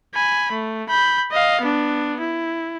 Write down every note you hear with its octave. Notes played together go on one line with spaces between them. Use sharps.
G#5 B5
A3
B5 G6
D#5 F5
B3 D4
E4